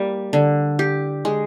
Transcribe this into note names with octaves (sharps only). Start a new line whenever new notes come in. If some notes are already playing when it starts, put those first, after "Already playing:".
Already playing: G3 A#3
D3
G4
G#3